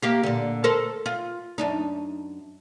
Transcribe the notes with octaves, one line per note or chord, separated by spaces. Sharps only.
A#3 G4 F5
A#2 D3
A4 A#4 C5
F4
F#2 D4 D#4